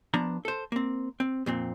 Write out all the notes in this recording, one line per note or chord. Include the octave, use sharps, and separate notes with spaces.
F3 B3 D4 A#5
A4 C5
A#3 C4
C4
F2 A#2 C4